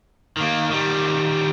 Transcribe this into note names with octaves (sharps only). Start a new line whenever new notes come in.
D#3 A#3
D#3 G3